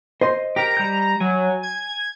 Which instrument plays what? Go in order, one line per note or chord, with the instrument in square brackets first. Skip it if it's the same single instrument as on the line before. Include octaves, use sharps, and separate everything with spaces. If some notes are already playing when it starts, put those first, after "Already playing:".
[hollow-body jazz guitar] C5 D#5 C6
[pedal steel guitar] G4 A#4 [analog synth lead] A#5
[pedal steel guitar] G3 G6
[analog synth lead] F#3 [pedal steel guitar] G#5
[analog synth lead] G#6